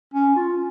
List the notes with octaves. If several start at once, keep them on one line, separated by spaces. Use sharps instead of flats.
C#4
F4